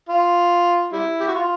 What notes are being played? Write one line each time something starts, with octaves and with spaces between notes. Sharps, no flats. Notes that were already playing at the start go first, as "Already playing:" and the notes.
F4
G3 E4
G4
F#4
F4